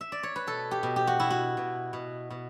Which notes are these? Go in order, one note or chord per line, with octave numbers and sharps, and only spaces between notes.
E5
D5
C#5
B4
B2 A4
G4
B2
G4
F#4
B2 E4
F#4
B2
B2
B2